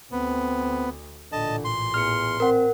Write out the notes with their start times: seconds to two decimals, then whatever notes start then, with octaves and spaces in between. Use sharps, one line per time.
0.12 D2 B3 C4
1.32 A1 A#2 D3 D#5 A5
1.65 C6
1.94 E2 F6 C#7
2.40 C4 A#4 F#5